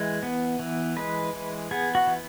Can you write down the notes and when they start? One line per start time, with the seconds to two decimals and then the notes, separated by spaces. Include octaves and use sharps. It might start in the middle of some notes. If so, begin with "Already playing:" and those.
Already playing: E3 G#3
0.23 B3
0.59 E3
0.97 G#3 B4
1.33 E3
1.71 B3 G#4
1.95 F#4
2.07 E3